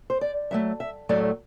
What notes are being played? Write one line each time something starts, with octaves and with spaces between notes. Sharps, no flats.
C5
D5
A2 F#3 A3 E5
E5
A2 F#3 A3 D5